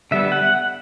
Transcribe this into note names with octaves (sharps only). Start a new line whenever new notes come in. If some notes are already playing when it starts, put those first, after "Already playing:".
D3 G3 B3 E5
F#5